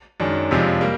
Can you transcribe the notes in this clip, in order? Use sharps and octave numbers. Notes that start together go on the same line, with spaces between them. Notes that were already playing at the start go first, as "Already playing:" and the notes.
F#2 D#3 G#3 D4
F2 C3 F3 G#3
G3 A#3